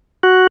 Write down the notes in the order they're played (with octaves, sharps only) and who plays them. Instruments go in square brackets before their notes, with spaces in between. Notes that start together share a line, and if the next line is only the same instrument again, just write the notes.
[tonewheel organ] F#4